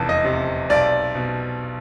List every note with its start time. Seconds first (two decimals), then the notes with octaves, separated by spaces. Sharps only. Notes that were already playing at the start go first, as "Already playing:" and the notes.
Already playing: F1 E2 A5
0.09 D#5
0.24 C3
0.69 B1 D5
1.15 B2